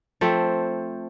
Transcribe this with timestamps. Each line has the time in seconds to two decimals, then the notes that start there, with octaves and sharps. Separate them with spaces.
0.21 F3 A3 C4